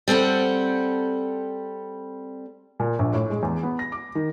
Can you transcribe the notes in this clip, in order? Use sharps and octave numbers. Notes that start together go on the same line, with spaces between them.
G3 C4 A4 F#5
A#2
A#1
A2
G#3
E2
B3
A#6
D6
D#3